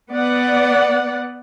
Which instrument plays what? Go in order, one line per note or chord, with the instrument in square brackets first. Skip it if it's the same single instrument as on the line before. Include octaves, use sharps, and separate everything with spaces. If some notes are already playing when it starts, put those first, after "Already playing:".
[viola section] B3 D5 F#5